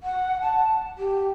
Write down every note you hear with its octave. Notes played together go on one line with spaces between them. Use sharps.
F#5
A5
G4